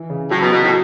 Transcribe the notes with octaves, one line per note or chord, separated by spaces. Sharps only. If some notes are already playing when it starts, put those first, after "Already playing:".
Already playing: E3
C#3
A2 F#3
B2
B2 F#3
A2